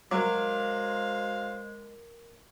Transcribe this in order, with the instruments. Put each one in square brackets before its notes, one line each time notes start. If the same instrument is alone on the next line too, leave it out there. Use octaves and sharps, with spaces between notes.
[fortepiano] F#3 [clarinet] G#3 [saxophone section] F#4 C5 F5 [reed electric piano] A#4 D6